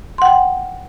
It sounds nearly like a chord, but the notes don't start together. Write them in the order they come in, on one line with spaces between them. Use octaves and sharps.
C6 F#5 G5